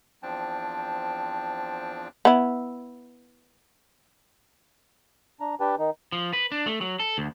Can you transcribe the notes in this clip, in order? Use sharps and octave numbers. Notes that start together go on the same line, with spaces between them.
E2 F3 C4 D4 G5 A5
B3 E4
D4 A#5
D4 G4 B4 G5 A5
D#3 D#4
F3
B4
D4
A3
F#3
A4
D2